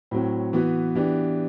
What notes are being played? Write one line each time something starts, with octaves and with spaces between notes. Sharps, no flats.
A2 F#3 C4
E3 B3 F#4
E3 B3 D4 G4